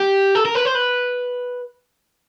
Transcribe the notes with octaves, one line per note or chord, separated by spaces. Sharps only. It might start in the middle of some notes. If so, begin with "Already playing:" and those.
Already playing: G4
A4
A#4
B4
C5
B4